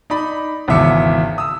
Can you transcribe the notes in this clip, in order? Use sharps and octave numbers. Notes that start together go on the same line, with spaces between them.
D#4 D5 B5
G#1 E2 C#3 E5 D6 C#7
D#6 E6